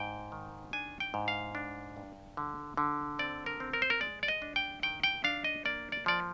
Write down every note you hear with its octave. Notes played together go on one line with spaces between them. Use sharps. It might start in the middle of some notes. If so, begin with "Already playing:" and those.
Already playing: G#2 G5
D#3
D4 G#5
G5
G#2
F5
D4
G2
D3
D3
C4 D5
A#4
C4
A#4
C5
A#4
G#3 D5
D5
D#5
D4
G5
D#3 G5
G5
D4 F5
D#5
A#3 D5
D5
F3 D5